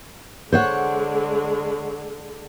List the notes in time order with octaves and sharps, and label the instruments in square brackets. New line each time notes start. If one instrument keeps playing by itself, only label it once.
[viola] D3 G#3 [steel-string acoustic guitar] C5 C#5 F#5